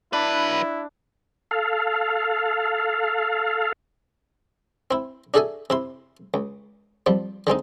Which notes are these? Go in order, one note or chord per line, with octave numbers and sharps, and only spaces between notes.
F#3 D4 E4 B4
A4 F5
C4 E4
D4 F#4 G#4 A4 E5 G#5
C3 E4 C6
C#2
F3 G3 C4
D3 G#3 C4 D#4